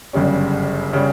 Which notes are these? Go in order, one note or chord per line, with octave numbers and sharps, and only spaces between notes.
G1 F#2 C#3 G3 C#4
C#3 G3 C#4